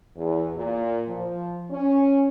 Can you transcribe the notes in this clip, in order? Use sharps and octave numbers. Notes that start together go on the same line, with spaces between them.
E2
A#2
F3
C#4